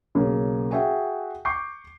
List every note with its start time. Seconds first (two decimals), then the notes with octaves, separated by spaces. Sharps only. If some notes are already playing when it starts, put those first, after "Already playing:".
0.15 B1 C#3 A#3
0.71 F#4 G#4 E5 G5
1.45 C#6 D6 G6 C7